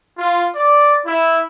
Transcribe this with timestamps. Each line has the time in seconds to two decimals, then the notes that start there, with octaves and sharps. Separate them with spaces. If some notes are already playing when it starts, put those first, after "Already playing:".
0.18 F4
0.55 D5
1.06 E4